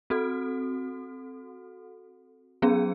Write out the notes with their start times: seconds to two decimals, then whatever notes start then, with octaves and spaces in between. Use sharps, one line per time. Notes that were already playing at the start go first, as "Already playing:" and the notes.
0.10 C4 F#4 A4
2.62 F#3 B3 C#4 G#4